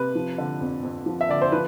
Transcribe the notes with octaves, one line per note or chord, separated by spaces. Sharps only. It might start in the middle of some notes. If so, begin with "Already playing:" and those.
Already playing: C3 B4
F3
D3
F2
F2
F3
E5
D3 D5
C5
F3 B4